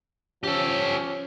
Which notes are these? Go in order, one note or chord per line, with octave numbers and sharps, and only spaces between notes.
F3 C#4 G4 A4